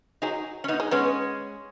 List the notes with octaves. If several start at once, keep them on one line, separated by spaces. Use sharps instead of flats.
F#3 D#4 G#4
C#4
B3 D#4
G#3
G#3 B3 C#4